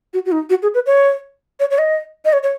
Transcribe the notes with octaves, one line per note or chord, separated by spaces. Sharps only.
F#4
F#4
D#4
F#4
G#4
B4
C#5
C#5
C#5
D#5
D#5
C#5
C#5